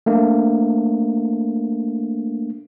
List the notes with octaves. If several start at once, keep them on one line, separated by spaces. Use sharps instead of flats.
A3 A#3 D4